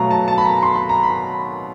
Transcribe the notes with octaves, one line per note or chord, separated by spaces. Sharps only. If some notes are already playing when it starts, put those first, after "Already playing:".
Already playing: B2 F#3 A3 F5 A#5
A5
A5
B5
A#5
C6
B5
A#5
B5